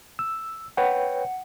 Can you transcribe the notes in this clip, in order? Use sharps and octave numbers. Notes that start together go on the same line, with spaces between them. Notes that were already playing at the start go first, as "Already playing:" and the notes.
E6
B4 C#5 F#5 G5